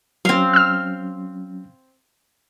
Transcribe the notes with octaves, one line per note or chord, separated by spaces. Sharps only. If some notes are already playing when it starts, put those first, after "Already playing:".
F#3 C4 C#4 F5
E6 F6